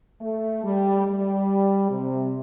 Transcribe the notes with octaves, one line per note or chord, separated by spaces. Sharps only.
A3
G3
G3
C3